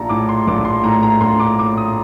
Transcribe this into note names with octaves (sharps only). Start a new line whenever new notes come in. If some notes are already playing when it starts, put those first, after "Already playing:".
Already playing: A#1 A5 A#5
A2 D6
C6
A#1 D6
C6
A2 A#5
A#5
A#1 C6
D6
A2 D6
D#6